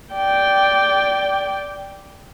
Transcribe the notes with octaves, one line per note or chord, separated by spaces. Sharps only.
D5 G5